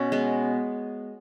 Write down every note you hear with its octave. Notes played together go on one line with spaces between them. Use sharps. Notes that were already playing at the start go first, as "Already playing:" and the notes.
Already playing: B2 C#4
G#3 B3